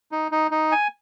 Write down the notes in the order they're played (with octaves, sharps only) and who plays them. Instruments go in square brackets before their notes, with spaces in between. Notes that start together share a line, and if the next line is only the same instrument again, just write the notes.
[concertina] D#4
D#4
D#4
G#5